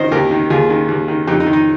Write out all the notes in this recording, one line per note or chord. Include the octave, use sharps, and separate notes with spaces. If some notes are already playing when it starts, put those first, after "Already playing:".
Already playing: D#3 C5 D#5
D#2 G4 A#4
D#3
D#2 F4 G#4
D#3
D#2
D#3
F2 D#4 G4
D#4
D#3
D#4